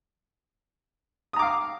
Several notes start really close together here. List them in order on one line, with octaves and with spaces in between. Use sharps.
D#6 A#5 D6 F5